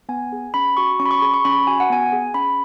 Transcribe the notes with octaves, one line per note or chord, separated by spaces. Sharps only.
B3 G#5
G#4
C#4 B5
F#4 C#6
C#4 C#6
B5
C#6
G#4 B5
C#6
C#4 B5
F#4 G#5
F#5
B3 G#5
G#4
C#4 B5